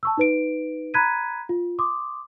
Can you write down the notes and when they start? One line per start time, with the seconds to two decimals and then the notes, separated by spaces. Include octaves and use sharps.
0.03 A5 C#6 E6
0.17 D#4 B4 D7
0.94 A#5 B5 F#6 G#6 B6 D#7
1.49 F4
1.79 C6 D6 D#6